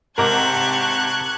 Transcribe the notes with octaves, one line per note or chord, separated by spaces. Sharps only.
G#2 C3 G4 A#4 A5 C#6 F#6 G#6